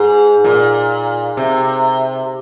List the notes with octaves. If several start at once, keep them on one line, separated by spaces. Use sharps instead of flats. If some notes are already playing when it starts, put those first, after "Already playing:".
Already playing: G#2
A#2
C3